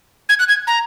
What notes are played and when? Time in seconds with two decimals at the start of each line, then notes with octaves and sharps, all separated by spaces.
0.29 G#6
0.39 F#6
0.48 G#6
0.67 A#5